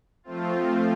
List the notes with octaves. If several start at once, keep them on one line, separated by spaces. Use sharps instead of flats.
F3 A3 C4 F4